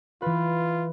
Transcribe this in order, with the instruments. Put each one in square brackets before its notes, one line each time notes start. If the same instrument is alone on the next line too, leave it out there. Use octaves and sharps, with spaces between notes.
[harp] E3 B4 [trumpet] F4